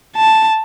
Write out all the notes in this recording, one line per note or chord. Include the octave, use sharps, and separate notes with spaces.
A5